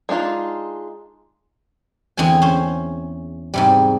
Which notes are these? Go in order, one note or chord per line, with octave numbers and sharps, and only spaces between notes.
G#3 D4 D#4 F4
E2 D3 C4 G#5
C#4 C5
G#2 C3 G3